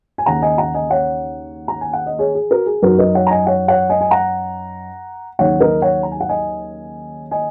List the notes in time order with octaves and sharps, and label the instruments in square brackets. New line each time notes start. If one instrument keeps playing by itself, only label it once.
[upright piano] G#5
D#2 C#3 A#3 C#4 F#5 A#5
D#5 G#5
F#5 A#5
D#5 G#5
C#5 F#5
A#5
G#5
F#5
D#5
G#4 C#5
G#4
F#4 A#4
G#4
F#2 F#3 D#4 F#4 A#4
A#4 D#5
C#5 F#5
A#5
D#5 G#5
C#5 F#5
C#5 F#5
D#5 G#5
G#5
F#5 A#5
D#2 C#3 F#3 D#4 C#5 F#5
A#4 D#5
C#5 F#5
A#5
G#5
F#5
D#5 G#5
D#5 G#5